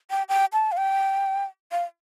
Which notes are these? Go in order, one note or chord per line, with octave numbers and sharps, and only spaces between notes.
G5
G5
A5
F5
G5
F5